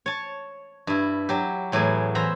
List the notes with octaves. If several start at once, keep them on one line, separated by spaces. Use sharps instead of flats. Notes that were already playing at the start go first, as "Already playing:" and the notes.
C#5 A5
G2 E4
F#3 G4
E2 A2 F#3 B3 G#4
E3 C5 E5 A#5 B5